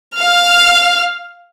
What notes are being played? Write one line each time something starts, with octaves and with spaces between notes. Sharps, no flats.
F5 F6